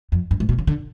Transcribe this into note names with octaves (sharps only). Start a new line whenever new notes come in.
F2
G2
G#2
B2
C#3
D3